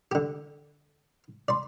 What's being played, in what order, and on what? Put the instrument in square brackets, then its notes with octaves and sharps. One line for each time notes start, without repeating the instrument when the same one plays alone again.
[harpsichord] D3 G4
D5 C6